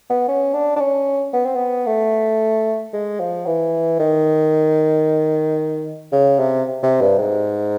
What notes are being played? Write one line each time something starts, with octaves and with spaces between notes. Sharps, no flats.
B3
C#4
D4
D4
C#4
B3
C4
B3
A3
G#3
F3
E3
D#3
C#3
C3
C3
G2
G#2